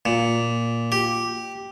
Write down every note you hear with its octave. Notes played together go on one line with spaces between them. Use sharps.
A#2
G4